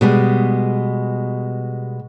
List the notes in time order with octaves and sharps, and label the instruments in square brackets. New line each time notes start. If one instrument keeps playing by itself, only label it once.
[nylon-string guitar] B2 G3 G#3